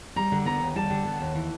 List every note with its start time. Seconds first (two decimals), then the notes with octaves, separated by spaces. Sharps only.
0.16 G3 A#5
0.32 D3
0.45 B3 A#5
0.61 D#2
0.75 G3 A5
0.90 D3
1.05 B3
1.20 D#2
1.35 E3